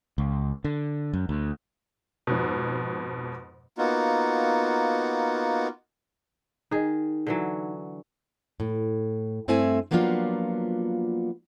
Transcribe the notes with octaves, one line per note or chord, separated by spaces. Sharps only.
C#2
D3
F#2
D2
F2 G#2 B2
A#3 B3 D#4 F4 F#4
D#3 D#4 G#4
D3 E3 F#3
A2
G2 A3 C4 E4 E5 G#5
F3 F#3 A#3 B3 D4 F4